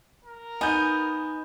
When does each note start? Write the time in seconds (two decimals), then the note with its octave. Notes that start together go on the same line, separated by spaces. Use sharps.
0.24 A#4
0.61 B3 D#4 G#5 G6